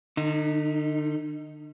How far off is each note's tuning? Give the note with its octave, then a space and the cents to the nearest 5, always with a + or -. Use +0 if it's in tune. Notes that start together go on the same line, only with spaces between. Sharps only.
D3 +40 D#4 +0